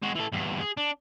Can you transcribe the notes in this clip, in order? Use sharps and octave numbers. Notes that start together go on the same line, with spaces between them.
G#3 F#4
E3 A4
E2 G2
G#4
D4